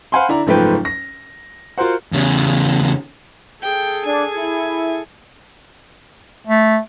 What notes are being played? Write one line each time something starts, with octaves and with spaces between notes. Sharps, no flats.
C5 F5 F#5 G#5 B5 C6
D3 E4 D5 A#5
F#1 G#2 F3 A3 B4 G5
A#6
F4 F#4 A#4 C5 F#5
E2 C#3
G#4 A4 G5
D4 G#5
E4
A3